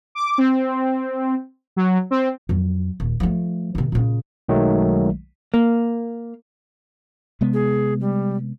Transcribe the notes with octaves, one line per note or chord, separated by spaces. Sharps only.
D6
C4
F#3
C4
F2 F#3
D#1
F3 A3
C3 D#3
A#2 C#3
B1 D#3 F#3 G#3 A3
A#3
C3 G#3 B3
G#4
G3